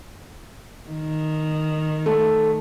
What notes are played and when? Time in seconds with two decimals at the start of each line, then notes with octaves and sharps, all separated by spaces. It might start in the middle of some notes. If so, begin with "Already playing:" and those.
0.90 D#3
2.06 A3